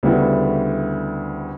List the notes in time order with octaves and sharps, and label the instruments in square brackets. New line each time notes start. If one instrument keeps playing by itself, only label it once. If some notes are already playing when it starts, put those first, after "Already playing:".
[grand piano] D2 C#3 G3 B3 E4